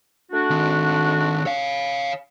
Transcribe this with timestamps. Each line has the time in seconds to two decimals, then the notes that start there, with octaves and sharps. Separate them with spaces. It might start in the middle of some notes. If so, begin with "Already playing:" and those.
0.32 A3 D4 F#4
0.50 D#3 C4
1.46 C#5 F5